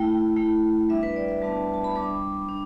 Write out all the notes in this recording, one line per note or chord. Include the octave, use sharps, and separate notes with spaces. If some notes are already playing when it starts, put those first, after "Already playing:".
Already playing: A3 E4 G5
A3 E4
G3 B3 D4 E5
B4
D5
E5
G3 B3 D4 A5
A5
B5
G3 D4 D6
D4